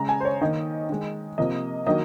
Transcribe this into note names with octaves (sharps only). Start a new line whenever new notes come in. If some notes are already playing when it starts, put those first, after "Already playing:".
Already playing: C#3 G#3 A#5
G#5
C5
C#5
D#3 A#3 D#5
D#3 G#3
C3 F3 A#3 D#5
D#3 F#3 A#3 D#5